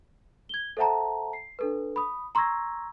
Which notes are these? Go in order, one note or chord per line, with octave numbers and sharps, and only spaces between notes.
G#6 G7
A4 C5 E5 F#5 A5 A#5
C7
D4 A4 B4
B5 D#6
A#5 C6 C#6 E6 G#6 A#6